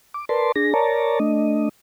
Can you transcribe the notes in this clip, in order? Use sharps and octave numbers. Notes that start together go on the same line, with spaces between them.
D6
A#4 B4 D5 A5 C6
D4 G#4 A#6
A#4 C#5 D5 A5 A#5
A3 D4 D#5